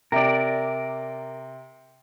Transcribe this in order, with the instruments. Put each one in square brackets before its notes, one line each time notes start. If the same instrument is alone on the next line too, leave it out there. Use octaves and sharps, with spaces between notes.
[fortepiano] C3 [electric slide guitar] A#4 D5